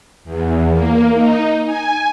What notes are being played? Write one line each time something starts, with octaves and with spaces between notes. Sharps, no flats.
E2
A#3
D#4
G#5